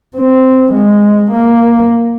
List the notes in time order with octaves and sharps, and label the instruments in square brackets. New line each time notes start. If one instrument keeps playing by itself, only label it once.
[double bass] C4
G#3
A#3